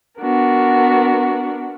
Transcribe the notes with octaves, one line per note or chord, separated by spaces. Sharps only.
B3 D4 F#4 A#4